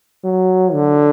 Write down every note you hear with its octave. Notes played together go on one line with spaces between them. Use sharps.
F#3
D3